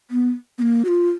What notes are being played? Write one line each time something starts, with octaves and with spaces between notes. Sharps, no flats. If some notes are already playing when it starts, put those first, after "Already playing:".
B3
B3
A#3
F#4
F4